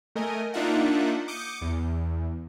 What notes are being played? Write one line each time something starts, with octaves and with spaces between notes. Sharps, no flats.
A3 A#4 D#5 G#5
A#3 D4 D#4 F4 E5 F#5
D6 D#6 G6 C#7
E2